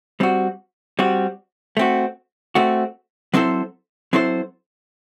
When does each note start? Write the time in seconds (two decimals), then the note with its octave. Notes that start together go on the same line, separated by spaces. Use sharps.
0.20 G3 C4 F#4
0.99 G3 C4 F#4
1.77 A3 C4 F#4
2.55 A3 C4 F#4
3.34 F#3 C4 E4 A4 C5
4.13 F#3 C4 E4 A4 C5